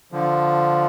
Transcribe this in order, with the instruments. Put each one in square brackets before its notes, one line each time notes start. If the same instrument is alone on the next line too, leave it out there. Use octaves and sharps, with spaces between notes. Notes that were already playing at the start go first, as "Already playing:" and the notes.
[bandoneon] D3 F3